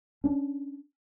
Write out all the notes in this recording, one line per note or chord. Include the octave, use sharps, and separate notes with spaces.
C#4 D4